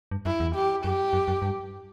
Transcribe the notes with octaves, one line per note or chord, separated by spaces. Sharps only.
G2
F#2 E4
E2
G4
F#2 G4
F#2
F#2
G2